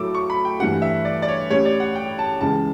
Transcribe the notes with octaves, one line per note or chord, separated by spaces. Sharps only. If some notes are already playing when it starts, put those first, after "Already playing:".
Already playing: A2 F#3 A3 E4 A4 D6 E6
C#6
B5
G5
G2 E3 A3 D4 G4 F#5
E5
D5
D5
C#5
A2 G3 C#4 G4 C#5
D5
F#5
G5
A5
C#2 C#3 E3 A5